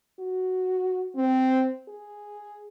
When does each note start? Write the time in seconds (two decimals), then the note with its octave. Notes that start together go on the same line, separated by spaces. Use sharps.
0.19 F#4
1.15 C4
1.88 G#4